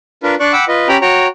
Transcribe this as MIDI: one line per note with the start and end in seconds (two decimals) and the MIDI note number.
0.23 0.35 62
0.23 0.35 65
0.23 0.35 70
0.23 0.35 71
0.40 0.52 62
0.40 0.52 74
0.40 0.52 85
0.40 0.52 90
0.53 0.65 78
0.53 0.65 79
0.53 0.65 83
0.53 0.65 86
0.53 0.65 88
0.68 0.88 65
0.68 0.88 71
0.68 0.88 75
0.88 0.97 61
0.88 0.97 67
0.88 0.97 79
0.88 0.97 82
0.88 0.97 83
1.01 1.27 66
1.01 1.27 73
1.01 1.27 79
1.01 1.27 82